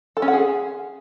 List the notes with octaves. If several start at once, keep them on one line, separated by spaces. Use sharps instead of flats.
A4
C#4
F#5
G#4